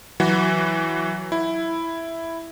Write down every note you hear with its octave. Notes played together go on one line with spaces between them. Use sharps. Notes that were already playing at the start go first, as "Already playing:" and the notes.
E3 F#3 F#4
E4